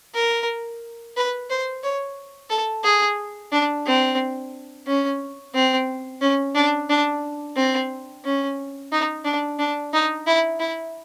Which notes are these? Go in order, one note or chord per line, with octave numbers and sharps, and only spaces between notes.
A#4
B4
C5
C#5
A4
G#4
D4
C4
C#4
C4
C#4
D4
D4
C4
C#4
D#4
D4
D4
D#4
E4
E4